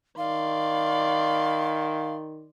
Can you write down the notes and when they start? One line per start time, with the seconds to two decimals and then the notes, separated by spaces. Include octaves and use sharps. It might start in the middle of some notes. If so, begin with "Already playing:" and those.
0.18 D#3 D5 F5 C6